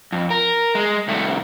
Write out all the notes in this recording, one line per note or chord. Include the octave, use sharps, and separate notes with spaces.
F2
A#4
G#3
C2 A3